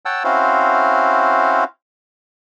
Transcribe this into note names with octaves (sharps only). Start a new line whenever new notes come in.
C#5 F#5 G5 A5 E6
C4 C#4 E4 F#4 C5 F5